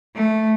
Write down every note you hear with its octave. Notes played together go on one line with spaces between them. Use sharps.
A3